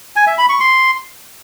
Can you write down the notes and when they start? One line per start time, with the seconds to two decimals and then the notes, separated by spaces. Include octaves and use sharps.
0.16 G#5
0.27 E5
0.38 B5
0.49 C#6
0.60 C6